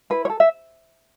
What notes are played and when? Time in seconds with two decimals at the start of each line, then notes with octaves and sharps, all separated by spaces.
0.10 E4 B4
0.25 C#5
0.30 A4
0.40 E5